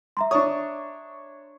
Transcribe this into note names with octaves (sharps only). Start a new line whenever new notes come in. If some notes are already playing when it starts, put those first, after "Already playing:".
E5 A#5 C6
D4 C#5 C#6 D#6